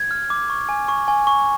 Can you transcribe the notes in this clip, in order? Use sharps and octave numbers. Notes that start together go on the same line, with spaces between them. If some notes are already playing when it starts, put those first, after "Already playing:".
Already playing: G#6
F6
D6
C#6
G#5
C#6
G#5
C#6